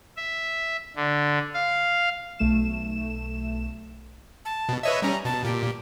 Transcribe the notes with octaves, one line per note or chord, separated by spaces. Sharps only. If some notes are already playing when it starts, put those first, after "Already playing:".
E5
D3
F5
B1 A3 E7
A5
B2
B4 C#5 D#5 E5
G3 C#4 A#5
B2 A5
A#2 G4